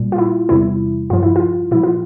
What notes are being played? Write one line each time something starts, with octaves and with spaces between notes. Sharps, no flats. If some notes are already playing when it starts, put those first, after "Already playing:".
Already playing: A#2 G3
F4
E4
E2 C3 G3 E4
G2 F3 F4
E4
F4
A#2 F3 E4
F4